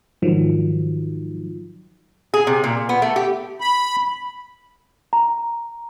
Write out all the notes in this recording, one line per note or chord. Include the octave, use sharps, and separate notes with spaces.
G#2 D#3 F3 F#3
G#4
C3
A#2
B3
A3
G4
B5
A#5